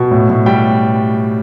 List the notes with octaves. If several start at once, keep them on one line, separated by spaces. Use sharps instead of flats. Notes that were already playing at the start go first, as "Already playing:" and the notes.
Already playing: B2
A2
A2
G3 G5